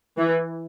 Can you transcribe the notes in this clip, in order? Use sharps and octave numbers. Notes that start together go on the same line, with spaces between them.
E3